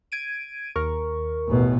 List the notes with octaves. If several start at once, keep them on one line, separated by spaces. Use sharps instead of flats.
G#6 D7 D#7
D#2 A#4 C#6
A1 B2